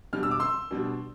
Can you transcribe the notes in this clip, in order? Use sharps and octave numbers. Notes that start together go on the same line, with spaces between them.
B2 G3 D4 F6
E6
D6
C6 E6
B2 G3 D4